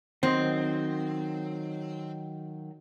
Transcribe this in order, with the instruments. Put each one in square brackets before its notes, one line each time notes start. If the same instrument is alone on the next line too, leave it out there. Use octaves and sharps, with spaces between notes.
[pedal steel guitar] D#3 F#3 D#5 [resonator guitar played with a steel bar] C4